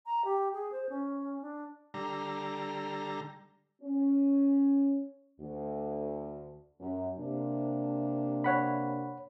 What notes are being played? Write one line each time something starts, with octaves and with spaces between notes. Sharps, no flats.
A#5
G4
G#4
C5
C#4
D4
D3 G3 A#5
C#4
D2
F#2
C3 A#3 D4
C#5 F#5 B5